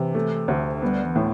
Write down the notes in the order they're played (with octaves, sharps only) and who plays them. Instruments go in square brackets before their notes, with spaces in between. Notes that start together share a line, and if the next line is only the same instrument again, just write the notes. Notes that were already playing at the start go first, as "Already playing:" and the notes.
Already playing: [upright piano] C3 [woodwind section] E3
[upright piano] A3
D2
[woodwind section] G3 [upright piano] B3
[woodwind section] E3
[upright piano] A2